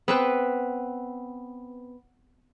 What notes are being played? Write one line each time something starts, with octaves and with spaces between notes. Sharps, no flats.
B3 C4 B4